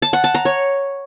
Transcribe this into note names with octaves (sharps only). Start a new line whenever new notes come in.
A5
F#5
A5
A#5
C#5